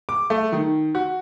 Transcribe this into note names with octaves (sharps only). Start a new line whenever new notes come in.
D6
A3
D#3
F#4